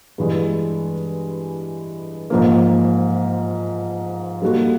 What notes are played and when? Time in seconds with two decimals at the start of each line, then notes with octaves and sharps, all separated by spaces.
0.18 G2 E3 G#3
2.30 G#2 F3 A#3
4.42 G3 A#3 D#4 F#4 A4